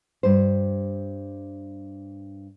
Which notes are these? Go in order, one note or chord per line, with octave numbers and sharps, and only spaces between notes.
G2 C5